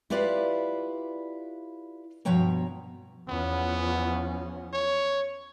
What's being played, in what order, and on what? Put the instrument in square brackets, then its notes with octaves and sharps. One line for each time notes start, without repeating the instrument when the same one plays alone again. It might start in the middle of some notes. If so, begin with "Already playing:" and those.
[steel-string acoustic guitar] E4 F4 G4 B4 D5 F5
G2 B2 F3 C#5 G5 A#5
[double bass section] E2 F3 C#4 [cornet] B3
[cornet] C#5